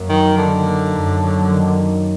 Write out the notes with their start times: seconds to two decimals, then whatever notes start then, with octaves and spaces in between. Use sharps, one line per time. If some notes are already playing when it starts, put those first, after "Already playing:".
Already playing: F#2 A#3
0.09 D#3 F#3
0.37 D3 D#3
0.66 A#3
0.96 F#2
1.24 F#3
1.53 D#3